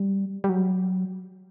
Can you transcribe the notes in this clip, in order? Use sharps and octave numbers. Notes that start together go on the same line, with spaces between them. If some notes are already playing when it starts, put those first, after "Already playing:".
Already playing: G3
G3
F#3